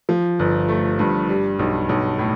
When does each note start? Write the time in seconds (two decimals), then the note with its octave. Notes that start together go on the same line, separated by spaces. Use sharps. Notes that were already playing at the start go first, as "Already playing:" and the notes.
0.09 F3
0.39 G1
0.68 A3
0.99 G2
1.29 G3
1.59 B1
1.89 B1
2.19 A2